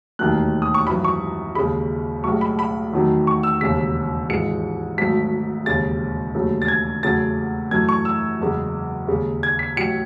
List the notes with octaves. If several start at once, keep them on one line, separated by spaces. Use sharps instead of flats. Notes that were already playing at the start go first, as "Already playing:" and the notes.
E1 D#2 D#3 F#3 A3 F#6
D#6
C#6
G#1 F#2 E3 B5
C#6
D#2 C#3 G#3 B5
B1 A2 G#3 C#6
B5
B5
E2 D#3 F#3 A3
C#6
E6
E1 D#2 C#3 B6
G#1 G#2 E3 G#3 C#7
G#1 G#2 F#3 A3 B6
E1 D#2 C#3 A6
E1 D#2 C#3 F#3 A3
A6
G#6
E2 C#3 F#3 A3 A6
F#2 E3 A3 G#6
C#6
E6
F#1 E2 C#3 G#3
D#2 C#3 G#3
G#6
B6
A1 A2 F#3 C#7